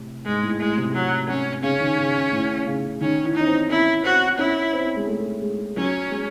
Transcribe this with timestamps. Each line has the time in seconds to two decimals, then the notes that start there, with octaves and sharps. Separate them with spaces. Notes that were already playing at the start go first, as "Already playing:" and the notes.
Already playing: A2 C3
0.25 G#2 G#3
0.43 A2
0.60 A2 G#3
0.77 C3
0.94 F#3
1.29 C#4
1.63 C#3 C#4
1.80 D#3
1.98 C#3
2.32 A2
2.66 C#3
3.01 D#3 C#4
3.24 E3
3.35 D#4
3.41 C#4
3.47 C4
3.70 C#4 E4
4.04 C4 F#4
4.38 C#4 E4
4.73 C4
4.96 G#3
5.07 A3
5.42 G#3
5.76 F#3 C#4
6.11 G#3